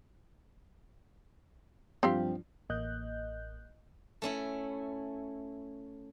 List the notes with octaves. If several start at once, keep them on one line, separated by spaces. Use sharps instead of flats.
G2 F3 C4 G4 F5
A1 A#3 D#5 F#6 G6
A3 C#4 E4